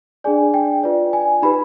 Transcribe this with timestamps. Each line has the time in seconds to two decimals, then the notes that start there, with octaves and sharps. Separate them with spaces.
0.24 D4 G#4 D5 G#5
0.54 G5
0.83 F4 B4 D5
1.13 G#5
1.42 D#4 G4 B4 B5